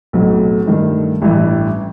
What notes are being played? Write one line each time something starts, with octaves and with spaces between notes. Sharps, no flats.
B1 A2 F#3 C4
G2 D#3 A3
A1 G2 E3